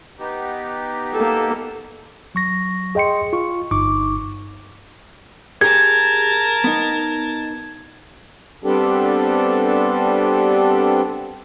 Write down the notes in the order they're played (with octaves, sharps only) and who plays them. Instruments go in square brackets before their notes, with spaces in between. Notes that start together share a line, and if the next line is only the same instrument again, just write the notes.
[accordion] B3 D#4 G4
[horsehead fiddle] A#3 A4
[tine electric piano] F#3 C#6 A#6
G#4 D#5 G5 C6 C#7
F4 C#6
G1 G2 D#4 C#6 D6
[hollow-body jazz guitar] G4 G#4 C#5 [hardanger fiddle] A#4 A5 [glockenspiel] G#6
[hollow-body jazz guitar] B3 D#4
[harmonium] G3 B3 C4 D4 G4 A4